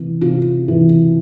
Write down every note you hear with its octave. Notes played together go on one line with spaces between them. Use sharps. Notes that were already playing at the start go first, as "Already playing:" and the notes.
Already playing: C3 E3
C3 F4
E3